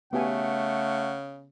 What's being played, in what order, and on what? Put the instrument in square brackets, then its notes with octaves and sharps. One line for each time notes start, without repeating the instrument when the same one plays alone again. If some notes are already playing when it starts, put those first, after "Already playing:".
[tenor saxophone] C#3 [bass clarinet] A3 [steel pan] B3 G4 G#5 [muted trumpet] F#5